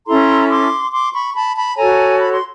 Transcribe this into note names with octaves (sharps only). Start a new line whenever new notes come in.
C#4 E4 A4 A#5 C6
C6 D6
C6 D6
B5 C#6
A5 B5
A5 B5
F#4 A4 C#5 G#5 A#5
B5
C6